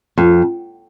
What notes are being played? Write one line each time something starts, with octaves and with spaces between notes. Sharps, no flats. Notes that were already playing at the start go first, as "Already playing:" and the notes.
F2